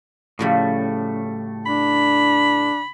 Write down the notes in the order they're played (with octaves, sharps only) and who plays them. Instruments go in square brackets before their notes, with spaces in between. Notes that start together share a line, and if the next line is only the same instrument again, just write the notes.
[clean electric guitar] A2 G3 A3 [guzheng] C#3 F3 F#4
[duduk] D4 [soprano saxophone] B5